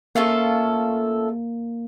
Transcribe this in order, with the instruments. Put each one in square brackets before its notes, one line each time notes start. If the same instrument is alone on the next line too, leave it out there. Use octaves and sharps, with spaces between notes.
[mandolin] A3 C#4 F4 A4 [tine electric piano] A#3